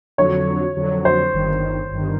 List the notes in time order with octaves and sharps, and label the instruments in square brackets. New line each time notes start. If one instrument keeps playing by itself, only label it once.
[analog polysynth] F2 D3 F#3 [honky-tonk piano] C#5
[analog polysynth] F2 D3 F#3
[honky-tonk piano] C5
[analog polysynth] G1 G2 D#3
G1 G2 D#3